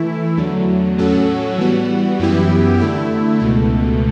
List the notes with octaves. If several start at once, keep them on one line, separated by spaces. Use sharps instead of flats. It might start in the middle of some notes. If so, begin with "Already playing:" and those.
Already playing: E3 A3 E4
E2 D3 F#3 A3
A2 F#3 C#4 F#4 A4
E3 G3 B3 F#4
F#2 E3 B3 E4 G4
D3 A3 E4
C#2 B2 A3